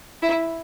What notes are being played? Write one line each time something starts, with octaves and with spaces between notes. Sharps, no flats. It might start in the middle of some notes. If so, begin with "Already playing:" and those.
E4